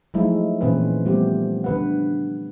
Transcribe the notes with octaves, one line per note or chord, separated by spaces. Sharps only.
F3 F#3 G#3 A3 D#4 E4
A#2 E3 C4 C#4 B4
F3 G3 A3 B3 C4 G4
D3 B4 F#5